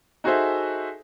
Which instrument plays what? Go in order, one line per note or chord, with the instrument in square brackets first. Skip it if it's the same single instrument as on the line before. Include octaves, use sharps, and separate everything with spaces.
[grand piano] D#4 F#4 G#4 A4 C5 E5